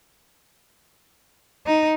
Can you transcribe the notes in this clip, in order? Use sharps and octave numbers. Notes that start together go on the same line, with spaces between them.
D#4